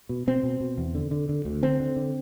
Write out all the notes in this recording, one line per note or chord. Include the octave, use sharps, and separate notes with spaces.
B2
B2 C4
B2
B2
E2
D3
D3
D3
D2
D3 C4
D3
D3